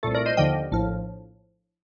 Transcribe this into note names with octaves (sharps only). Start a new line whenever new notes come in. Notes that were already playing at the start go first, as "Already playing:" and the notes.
C2 A#2 A3 A4
A#4 D5
C5 D#5
D#2 D3 F3 D#5 G5
A#1 A2 F3